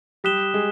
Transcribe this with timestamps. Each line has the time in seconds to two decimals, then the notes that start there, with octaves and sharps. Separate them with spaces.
0.24 G3 G4 D#6 F#6 B6 E7 G7
0.54 G#3 G#4